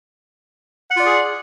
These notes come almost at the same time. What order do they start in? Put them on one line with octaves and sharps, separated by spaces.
F#5 F4 D5 G#4